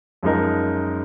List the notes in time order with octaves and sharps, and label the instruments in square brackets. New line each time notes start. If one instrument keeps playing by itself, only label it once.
[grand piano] F#2 F3 G#3 D#4 A#4